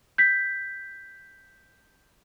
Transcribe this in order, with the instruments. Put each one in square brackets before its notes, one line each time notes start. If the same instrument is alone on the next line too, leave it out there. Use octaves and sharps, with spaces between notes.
[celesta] G6 B6